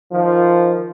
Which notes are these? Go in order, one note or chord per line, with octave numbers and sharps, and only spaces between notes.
D#3 F3